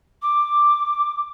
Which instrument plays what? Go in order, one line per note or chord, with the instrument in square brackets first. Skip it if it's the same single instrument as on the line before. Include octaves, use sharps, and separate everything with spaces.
[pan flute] D6